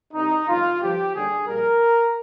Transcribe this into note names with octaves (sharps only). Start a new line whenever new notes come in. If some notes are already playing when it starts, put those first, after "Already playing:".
C2 C3 G3 D#4
G1 F2 D#3 F4
G1 G2 F3 G4
D#2 D3 G3 G#4
A#1 A#2 G3 A#4